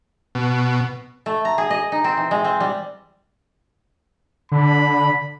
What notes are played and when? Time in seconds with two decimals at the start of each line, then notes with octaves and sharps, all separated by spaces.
0.35 B2
1.26 A3
1.45 A#5
1.58 G#4
1.70 D#5
1.92 D#4
2.04 C4
2.17 E3
2.31 G#3
2.44 C4
2.60 G3
4.52 D3 B5